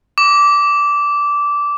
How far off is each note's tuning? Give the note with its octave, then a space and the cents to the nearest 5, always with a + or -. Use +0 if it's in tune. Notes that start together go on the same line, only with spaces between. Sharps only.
D6 -15